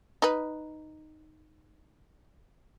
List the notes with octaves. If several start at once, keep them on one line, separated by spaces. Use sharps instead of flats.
D#4 B4